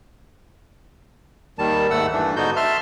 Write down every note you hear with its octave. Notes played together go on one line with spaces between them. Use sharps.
D#2 D#3 G3 A5
D#2 G#2 A3 F#5 E6
G2 E3 A3 D4
G#2 D3 B3 D#4 F#4 G6
E5 A5 C6 F6